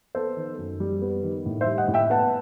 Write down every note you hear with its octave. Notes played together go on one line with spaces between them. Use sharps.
B3 A4 C5
D#3
F#2
G3
B3
D#3
A2
C5 E5
G3
D#5 F#5
A2
E5 G5
B3 F#5 A5